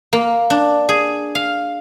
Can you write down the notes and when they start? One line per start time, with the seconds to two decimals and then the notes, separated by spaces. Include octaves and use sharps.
0.13 A#3
0.50 D4
0.89 G#4
1.35 F5